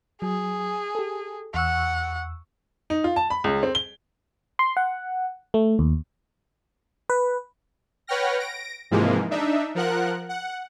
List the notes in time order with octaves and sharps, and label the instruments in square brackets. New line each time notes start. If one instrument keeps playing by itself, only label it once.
[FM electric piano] F#3 [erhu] G#4
[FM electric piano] G4 A4
[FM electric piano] E2 C#6 E6 [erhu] F#5
[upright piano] D#4
F4
A5
B5
C#2
C4
G7
[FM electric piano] C6
F#5
A3
D#2
B4
[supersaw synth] B4 C#5 F#5 G5 F6 A#6
A#6 D7
G#2 C3 E3 F3 G#3 A#3
D4 D#4 E5
F3 A#4 F#5 F#6
F#5